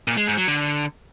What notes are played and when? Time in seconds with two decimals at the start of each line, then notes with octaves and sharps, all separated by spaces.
0.08 A#2
0.17 G#3
0.27 G#2
0.37 F#3
0.47 D3